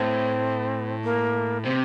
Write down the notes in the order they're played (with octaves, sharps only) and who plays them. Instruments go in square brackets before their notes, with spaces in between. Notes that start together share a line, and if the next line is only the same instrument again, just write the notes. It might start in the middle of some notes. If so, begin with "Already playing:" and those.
Already playing: [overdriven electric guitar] A2 [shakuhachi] C4
[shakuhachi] A#3
[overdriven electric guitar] C3 [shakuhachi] C4